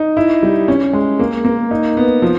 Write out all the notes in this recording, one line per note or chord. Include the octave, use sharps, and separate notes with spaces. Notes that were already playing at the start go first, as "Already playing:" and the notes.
Already playing: D#4
E4
G3
C#4
G#3
A#3
A#3
D#4
B3
F3